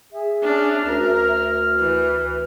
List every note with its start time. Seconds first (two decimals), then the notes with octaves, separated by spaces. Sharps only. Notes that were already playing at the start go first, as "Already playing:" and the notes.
0.12 G#4 E5
0.43 C#4 D4 F6
0.85 D2 A#4
1.79 E3 B4